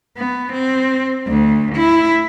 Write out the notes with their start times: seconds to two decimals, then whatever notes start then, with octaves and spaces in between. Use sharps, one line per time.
0.17 B3
0.52 C4
1.27 D2
1.75 E4